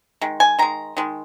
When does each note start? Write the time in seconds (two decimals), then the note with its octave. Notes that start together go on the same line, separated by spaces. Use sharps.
0.21 D#3 G#3
0.40 G#5
0.59 D#3 G#3 A#5
0.97 D#3 G#3